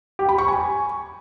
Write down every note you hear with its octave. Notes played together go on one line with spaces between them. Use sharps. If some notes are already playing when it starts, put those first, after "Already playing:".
G4
B5
C#6
G#5